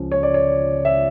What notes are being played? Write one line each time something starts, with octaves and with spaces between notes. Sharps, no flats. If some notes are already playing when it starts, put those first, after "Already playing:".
Already playing: C#2 C#3 F3 C#4
C#5
D5
C#5
E5